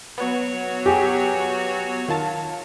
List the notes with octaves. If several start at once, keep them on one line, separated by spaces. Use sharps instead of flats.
F#3 B3 F#4 C#5
G4 G#4
D#3 F4 A5